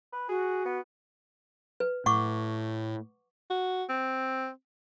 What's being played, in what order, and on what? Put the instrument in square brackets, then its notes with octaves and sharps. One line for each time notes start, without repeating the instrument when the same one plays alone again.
[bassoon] B4
[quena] F#4 [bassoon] G#4
[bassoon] B3
[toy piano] B4
[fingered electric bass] A2 [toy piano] F#5 C#6 D6
[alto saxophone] F#4
C4